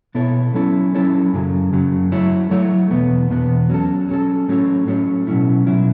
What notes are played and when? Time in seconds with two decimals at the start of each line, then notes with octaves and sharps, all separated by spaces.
0.15 B2 B3 E4 A4 C#5
0.54 F#3 C#4 E4 A4 C#5
0.95 F#3 C#4 E4 A4 C#5
1.33 F#2 C#3 F#3
1.73 F#2 C#3 F#3
2.12 F#3 A3 E4 C#5
2.51 F#3 A3 E4 C#5
2.91 E2 B2 B3
3.31 E2 B2 B3
3.69 F#3 C#4 A4
4.09 F#3 C#4 A4
4.49 A2 F#3 C#4 A4 C#5
4.87 A2 F#3 C#4 A4 C#5
5.27 B2 F#3 C#4 E4
5.67 B2 F#3 C#4 E4